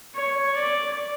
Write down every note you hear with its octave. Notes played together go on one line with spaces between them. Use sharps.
C#5
D5